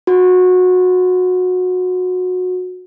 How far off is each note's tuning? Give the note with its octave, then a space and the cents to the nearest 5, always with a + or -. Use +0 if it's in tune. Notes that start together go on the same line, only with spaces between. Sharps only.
F#4 -20